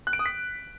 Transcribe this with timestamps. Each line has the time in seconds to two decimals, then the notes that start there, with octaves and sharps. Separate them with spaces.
0.07 F#6
0.13 D7
0.19 D#6
0.26 B6